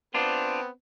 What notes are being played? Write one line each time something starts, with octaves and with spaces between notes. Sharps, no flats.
B3 C4 D4 F4